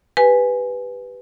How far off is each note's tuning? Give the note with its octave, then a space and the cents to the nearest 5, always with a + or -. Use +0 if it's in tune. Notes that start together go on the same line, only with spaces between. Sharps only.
G4 +0 B4 +0 G#5 +0